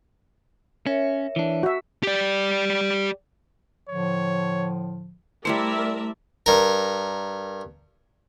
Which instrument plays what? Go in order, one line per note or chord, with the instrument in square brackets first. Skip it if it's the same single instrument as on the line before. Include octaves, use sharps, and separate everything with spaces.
[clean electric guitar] C#4 [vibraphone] A#4 C#5 E5
[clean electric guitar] E3 D4
[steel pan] F#4 E5
[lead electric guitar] G4 D5
[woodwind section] A2 D3 F3 [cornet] C#5
[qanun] G3 E4 C5 [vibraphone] A3 [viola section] A#4 D5 E5
[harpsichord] G2 A#4